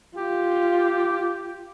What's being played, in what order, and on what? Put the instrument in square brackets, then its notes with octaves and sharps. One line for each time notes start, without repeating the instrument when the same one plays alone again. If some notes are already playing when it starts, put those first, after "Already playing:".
[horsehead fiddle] F4 [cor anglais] G4